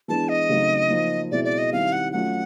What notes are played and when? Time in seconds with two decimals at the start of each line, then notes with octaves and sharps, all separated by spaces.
0.08 E3 G#3 B3 D4 A5
0.29 D#5
0.49 C#3 F#3 A3 C4 D#4
0.90 F3 A#3 D#4
1.31 B2 G#3 C4 E4 D5
1.45 D5
1.58 D#5
1.72 D#3 G3 C4 E4 F5
1.93 F#5
2.12 F#3 A3 C#4 F4 F#5